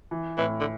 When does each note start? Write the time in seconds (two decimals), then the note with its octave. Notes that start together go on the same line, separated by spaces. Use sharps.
0.11 E3
0.38 A2 E3
0.60 D3